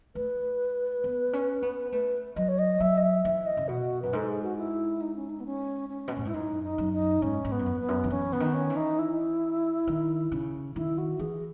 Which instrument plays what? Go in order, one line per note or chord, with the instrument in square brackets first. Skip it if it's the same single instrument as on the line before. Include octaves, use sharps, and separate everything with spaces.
[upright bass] A3 [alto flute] B4
[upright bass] B3
C#4
B3
[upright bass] A3 [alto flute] B4
[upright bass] F#3 [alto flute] D#5
[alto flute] C#5
D#5
[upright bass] F#3 [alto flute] E5
[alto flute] D#5
E5
[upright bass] E3 [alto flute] E5
[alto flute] D#5
[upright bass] C#3
[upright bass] B2 [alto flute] F#4
[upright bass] F#2 [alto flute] B4
[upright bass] G#2 [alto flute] A4
[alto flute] G#4
F#4
E4
D#4
C#4
D#4
B3
C#4
C#4
[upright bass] B2
A2
[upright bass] G#2 [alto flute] E4
[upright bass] F#2 [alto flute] D#4
[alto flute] D#4
[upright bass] F#2
[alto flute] D#4
[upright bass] G#2 [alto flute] C#4
[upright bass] G#2
[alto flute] B3
[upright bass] F#2
E2
[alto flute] B3
[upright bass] F#2
D#3
[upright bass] E3 [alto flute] C#4
[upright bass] C#3 [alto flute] B3
[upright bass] D#3
[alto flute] C#4
[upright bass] E3
[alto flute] D#4
E4
[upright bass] D#3
C#3
[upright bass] D#3 [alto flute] E4
[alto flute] F#4
[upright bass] E3 [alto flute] G#4